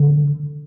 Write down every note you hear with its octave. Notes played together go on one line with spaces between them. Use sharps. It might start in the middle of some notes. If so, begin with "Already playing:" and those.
Already playing: D3